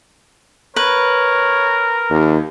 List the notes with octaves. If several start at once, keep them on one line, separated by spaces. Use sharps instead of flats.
A#4 B4 C#5
D#2